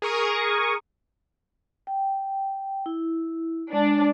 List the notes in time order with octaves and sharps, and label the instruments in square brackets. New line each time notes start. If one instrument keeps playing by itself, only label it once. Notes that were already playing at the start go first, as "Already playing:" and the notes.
[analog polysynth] G#4 A#4 C#6 D#6
[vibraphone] G5
E4
[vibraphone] G#3 [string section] D4